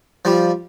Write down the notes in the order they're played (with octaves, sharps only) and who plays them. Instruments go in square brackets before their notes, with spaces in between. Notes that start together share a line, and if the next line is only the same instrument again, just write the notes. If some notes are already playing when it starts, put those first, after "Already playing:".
[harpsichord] F3 G3